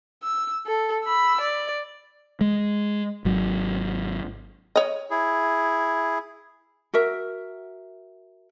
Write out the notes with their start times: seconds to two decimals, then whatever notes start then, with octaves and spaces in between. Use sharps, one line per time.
0.23 E6
0.66 A4
1.04 B5 E6
1.41 D5
2.41 G#3
3.25 G#1 F#3
4.76 C#5 D#5
5.10 E4 G#4
6.94 F#4 A#4 E5